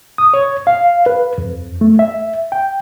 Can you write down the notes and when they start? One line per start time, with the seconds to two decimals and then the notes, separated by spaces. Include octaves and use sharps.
0.18 D#6
0.34 C#5
0.67 F5
1.06 B4
1.38 F2
1.81 A3
1.99 E5
2.52 G5